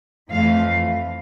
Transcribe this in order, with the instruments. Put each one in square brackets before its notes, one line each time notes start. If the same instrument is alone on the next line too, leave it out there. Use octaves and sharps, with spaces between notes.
[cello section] F2 E3 A3 F5